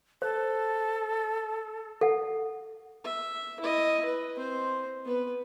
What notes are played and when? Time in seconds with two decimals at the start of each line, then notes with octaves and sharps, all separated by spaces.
0.22 A4 C5
2.01 A4 F#5
3.04 E5
3.60 E4 D#5
4.05 B4
4.36 C4 C5
5.05 B3 B4